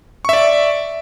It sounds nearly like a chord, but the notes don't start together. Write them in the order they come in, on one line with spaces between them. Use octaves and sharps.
C#6 E5 D5